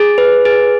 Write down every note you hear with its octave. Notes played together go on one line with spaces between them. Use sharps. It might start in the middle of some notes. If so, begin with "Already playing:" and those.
Already playing: G#4
B4
G#4